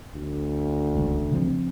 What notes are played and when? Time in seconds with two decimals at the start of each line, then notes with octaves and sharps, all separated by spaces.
0.14 D2
0.94 E1 C#2
1.31 C#3 F3 C4